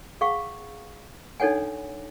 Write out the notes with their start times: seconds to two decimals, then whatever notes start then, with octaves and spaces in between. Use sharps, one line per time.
0.21 G#4 F5 F#5 C#6
1.40 D4 D#4 A4 C#5 F#5 G#5